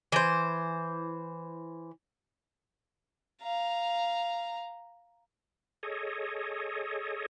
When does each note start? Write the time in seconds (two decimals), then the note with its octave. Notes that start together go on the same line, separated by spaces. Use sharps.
0.12 E3 C5
3.42 F5 A#5
5.83 G#4 A4 C#5 D#5